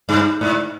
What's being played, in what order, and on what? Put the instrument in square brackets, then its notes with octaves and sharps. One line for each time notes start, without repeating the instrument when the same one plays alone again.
[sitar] G2
G#2